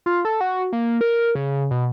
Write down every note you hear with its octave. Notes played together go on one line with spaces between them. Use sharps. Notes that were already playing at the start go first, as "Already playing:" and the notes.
F4
A4
F#4
A#3
A#4
C#3
B2